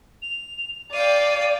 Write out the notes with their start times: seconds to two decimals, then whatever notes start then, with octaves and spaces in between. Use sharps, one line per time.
0.22 F7
0.93 D5 F5 G5 D#7